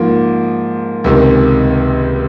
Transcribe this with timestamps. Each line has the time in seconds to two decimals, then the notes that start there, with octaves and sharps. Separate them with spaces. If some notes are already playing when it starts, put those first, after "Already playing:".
Already playing: G#2 F3 A#3
1.04 C#2 C3 D#3